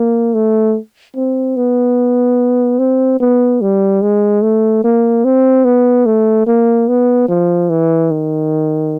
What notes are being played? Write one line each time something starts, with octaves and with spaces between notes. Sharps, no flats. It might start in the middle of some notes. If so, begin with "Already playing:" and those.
Already playing: A#3
A3
C4
B3
C4
B3
G3
G#3
A3
A#3
C4
B3
A3
A#3
B3
F3
E3
D#3